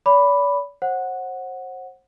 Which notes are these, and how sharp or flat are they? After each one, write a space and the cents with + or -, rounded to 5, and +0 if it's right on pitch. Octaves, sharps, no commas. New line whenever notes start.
D5 -45 B5 +0 D6 -10
C5 +35 F#5 -5